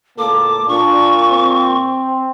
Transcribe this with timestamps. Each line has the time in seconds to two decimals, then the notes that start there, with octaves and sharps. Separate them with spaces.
0.19 C#2 A2 A#3 A4 D6
0.68 A#2 D4 C#6
1.30 C4